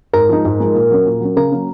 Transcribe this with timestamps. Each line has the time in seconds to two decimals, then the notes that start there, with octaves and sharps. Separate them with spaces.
0.14 G#2 A#4
0.29 F3 G#3 D#4
0.45 G#2
0.60 F3 G#3 D#4
0.75 A#2
0.91 F#3 C#4
1.05 A#2
1.20 F#3 C#4
1.36 C#3 A#4
1.51 F#3 A#3 C#4